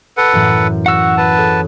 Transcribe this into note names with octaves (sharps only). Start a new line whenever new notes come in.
A4 B4 F#5
F#2 A2 E3
F#4 F#5 E6
B4 A5
G#4 A4 C#5